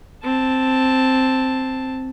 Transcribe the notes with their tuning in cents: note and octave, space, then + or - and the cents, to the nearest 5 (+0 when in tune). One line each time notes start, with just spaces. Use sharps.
C4 +0 A5 +0